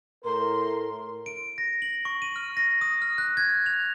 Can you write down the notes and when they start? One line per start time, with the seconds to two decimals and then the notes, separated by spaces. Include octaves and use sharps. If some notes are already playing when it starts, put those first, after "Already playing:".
0.25 A2 E4 A#4 C6
1.26 D7
1.58 A#6
1.82 F#7
2.05 C#6
2.22 D#7
2.36 F6
2.57 A#6
2.81 D#6
3.02 F6
3.18 F#6
3.37 G#6
3.66 F7